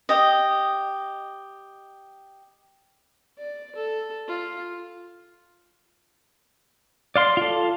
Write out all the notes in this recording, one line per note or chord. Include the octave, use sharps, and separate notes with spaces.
G4 D#5
D5
A4
F4
D5 F5 C6
F4 A4